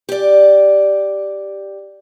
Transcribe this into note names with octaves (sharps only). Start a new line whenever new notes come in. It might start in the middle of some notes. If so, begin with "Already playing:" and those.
G4 D5